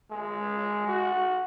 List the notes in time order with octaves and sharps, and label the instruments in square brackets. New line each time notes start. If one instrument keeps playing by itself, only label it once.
[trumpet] G#3
F#4